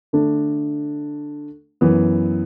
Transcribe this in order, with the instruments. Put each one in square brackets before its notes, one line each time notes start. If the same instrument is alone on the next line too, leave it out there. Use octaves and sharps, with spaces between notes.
[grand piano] D3 A3 D4
F#2 E3 B3